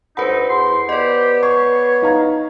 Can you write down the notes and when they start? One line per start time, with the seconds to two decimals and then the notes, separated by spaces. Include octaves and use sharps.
0.17 D2 D#4 B4 C5 F#5 B5
0.49 E2 C6
0.89 B3 G4 D5 D#5
1.43 C#5 C#6 C7
2.02 D#4 F5 A#5